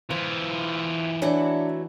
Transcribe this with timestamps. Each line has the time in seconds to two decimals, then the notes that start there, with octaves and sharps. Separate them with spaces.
0.11 E3 F4 C5
1.22 E3 F#3 A3 D4 E4 F#5 D6